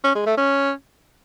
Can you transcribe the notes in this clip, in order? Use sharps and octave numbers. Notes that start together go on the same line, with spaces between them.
C#4
G#3
A3
C#4